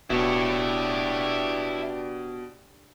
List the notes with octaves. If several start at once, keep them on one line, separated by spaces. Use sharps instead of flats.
D1 B2 D4 E4 G4 C#5